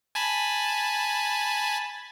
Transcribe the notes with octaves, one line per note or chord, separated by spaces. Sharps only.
G#5 A5 B5